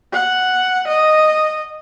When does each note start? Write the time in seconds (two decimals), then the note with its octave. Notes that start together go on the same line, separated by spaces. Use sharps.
0.13 F#5
0.88 D#5